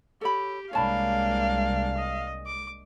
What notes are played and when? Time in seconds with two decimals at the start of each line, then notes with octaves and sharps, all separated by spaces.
0.21 G4 A4 C#5 B5
0.73 C2 G#3 A#3 D4 C#5 F5 A5 B5
1.97 D#5
2.46 D6